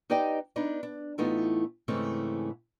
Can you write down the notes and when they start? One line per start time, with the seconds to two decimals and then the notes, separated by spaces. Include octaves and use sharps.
0.10 D#4 G4 B4 D5 D#5 G5
0.56 B3 D4 D#4 B4
0.83 D4
1.18 A2 E3 A3 B3 D#4 F4
1.88 G#2 C#3 E3 A3 C4 C#4